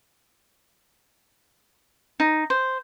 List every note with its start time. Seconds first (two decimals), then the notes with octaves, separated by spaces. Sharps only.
2.20 D#4
2.50 C5